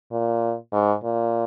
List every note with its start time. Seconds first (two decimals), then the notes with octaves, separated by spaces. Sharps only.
0.12 A#2
0.73 G#2
1.04 A#2